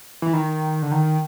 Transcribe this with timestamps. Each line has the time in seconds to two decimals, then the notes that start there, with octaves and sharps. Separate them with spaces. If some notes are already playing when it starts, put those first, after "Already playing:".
0.22 E3
0.33 D#3
0.82 D3
0.92 D#3